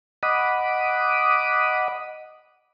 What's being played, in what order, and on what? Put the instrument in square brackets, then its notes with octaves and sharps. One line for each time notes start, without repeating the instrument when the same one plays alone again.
[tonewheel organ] D#5 F#5 B5 D6 D#6